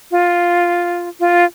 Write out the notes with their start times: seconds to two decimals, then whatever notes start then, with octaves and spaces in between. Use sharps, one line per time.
0.11 F4
1.20 F4